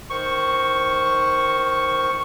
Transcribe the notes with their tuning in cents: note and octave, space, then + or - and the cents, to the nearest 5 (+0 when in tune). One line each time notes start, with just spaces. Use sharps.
D#3 +0 C5 +0 C#6 +0